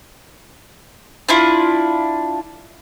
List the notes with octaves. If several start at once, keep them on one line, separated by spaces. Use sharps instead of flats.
D4 E4 F4